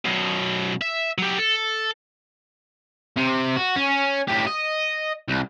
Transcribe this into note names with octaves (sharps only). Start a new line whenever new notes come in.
F#2 B2
E5
F#3 G4
A4
C3
F#4
C#4
A2 G4
D#5
C2